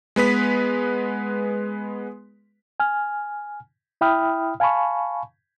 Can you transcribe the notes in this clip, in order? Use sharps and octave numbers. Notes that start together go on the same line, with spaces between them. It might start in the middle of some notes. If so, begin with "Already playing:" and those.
G#3 B3 B4 B6
G#5 F6
E4 E5 G5 B5 D#6 F6
F5 G#5 A5 B5 C#6